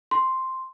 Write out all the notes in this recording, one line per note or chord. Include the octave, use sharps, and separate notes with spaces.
C6